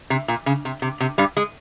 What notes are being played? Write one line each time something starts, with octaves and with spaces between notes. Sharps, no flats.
C3
A#2
C#3
C3
C3
C3
G2 G3
G#3